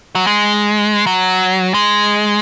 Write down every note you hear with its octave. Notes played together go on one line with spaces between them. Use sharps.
F#3
G#3
F#3
G#3